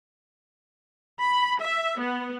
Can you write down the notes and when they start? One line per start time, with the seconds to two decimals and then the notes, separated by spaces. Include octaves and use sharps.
1.21 B5
1.61 E5
1.98 B3